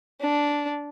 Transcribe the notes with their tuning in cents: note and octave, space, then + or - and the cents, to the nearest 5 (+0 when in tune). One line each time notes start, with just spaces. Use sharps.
D4 -10